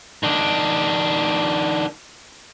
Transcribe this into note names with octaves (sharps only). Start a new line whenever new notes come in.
D#3 D4